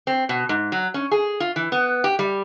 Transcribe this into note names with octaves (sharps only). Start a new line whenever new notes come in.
C4
B2
G#2
F#3
C#4
G#4
F4
E3
B3
G4
G3